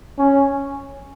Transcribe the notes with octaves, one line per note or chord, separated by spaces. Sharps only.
C#4